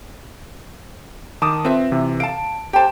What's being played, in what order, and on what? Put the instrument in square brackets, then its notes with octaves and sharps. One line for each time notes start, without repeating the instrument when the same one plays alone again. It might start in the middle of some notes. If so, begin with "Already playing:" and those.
[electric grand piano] D#3 D6 D#6 [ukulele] A5
[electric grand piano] C4 [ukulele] F4 B4 E5
[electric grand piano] C3 E3
[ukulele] F5 A5 [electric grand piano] D7
[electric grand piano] G4 C5 [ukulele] G5 A5